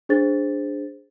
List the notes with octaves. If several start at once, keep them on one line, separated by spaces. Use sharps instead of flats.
D4 G#4 C5 A6